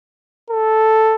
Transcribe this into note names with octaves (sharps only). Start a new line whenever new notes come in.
A4